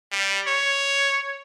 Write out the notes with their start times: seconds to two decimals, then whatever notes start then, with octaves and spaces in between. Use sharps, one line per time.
0.12 G3
0.47 C#5